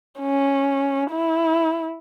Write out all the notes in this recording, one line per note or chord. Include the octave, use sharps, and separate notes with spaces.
C#4
E4